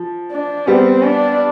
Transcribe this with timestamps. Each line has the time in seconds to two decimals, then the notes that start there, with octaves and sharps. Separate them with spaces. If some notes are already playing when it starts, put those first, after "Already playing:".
Already playing: F3
0.32 D4
0.67 G3 B3 C4
1.03 D4